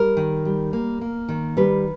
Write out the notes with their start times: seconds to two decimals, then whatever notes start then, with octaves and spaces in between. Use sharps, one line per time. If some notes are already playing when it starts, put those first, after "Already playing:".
Already playing: G3 A#4
0.17 D#3
0.45 G3
0.73 A#3
1.01 A#3
1.29 D#3
1.57 G3 B4